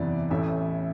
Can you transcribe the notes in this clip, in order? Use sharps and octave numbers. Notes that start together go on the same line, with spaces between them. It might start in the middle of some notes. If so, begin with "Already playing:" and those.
Already playing: F#1 E2 C3 E3 B3 D5
A1 A2 E3 E5